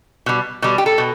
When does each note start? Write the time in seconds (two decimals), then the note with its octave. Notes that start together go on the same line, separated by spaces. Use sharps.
0.26 B2 G3
0.62 B2 G3
0.78 G4
0.86 A4
0.98 B2